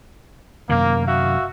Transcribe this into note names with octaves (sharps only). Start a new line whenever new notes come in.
F#2 C3 D#3 A#3
F#4 E5 F5